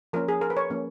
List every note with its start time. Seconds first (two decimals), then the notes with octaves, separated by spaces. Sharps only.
0.13 F3 A#3 C#4 A#4
0.28 G#4
0.41 A#4
0.50 B4
0.57 C#5
0.70 F3 A#3 C#4